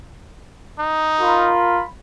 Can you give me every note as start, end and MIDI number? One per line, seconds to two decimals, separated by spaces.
0.79 1.52 63
1.21 1.83 65
1.21 1.83 70
1.21 1.83 83